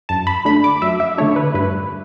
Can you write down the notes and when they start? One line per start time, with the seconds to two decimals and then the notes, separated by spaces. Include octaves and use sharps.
0.09 F#2 A5
0.27 B5
0.45 D3 A3 D4 B5
0.64 D6
0.82 F#2 E5
1.00 E5
1.18 D3 A3 D4 C#5
1.36 B4
1.54 G2 B4